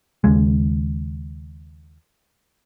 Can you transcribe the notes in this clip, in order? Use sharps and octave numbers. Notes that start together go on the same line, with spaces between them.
D#2 C#3 G#3